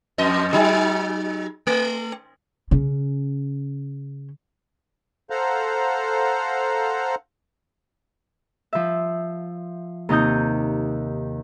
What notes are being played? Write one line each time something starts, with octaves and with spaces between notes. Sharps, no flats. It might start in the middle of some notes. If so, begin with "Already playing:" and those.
F2 D#5
F#3 D#4 G#4
A3
C#3 C#4
A4 C5 F5 F#5 A#5
F3 E5
D#2 C3 D#4 D#6 G6